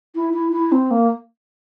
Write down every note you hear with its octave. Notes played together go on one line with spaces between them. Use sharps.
E4
E4
E4
C4
A#3